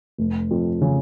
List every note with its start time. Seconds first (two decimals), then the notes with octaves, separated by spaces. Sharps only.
0.18 F1
0.51 F2
0.81 C#3